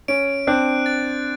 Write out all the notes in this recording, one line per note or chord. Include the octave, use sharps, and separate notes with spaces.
C#4 D7
C4 D4 F#6
A6